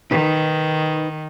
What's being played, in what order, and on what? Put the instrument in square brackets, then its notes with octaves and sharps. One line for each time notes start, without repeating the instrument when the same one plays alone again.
[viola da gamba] D#3 [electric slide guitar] D#4 B4